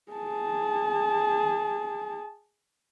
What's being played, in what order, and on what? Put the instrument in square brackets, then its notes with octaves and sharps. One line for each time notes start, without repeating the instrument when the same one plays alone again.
[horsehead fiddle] G#4 A5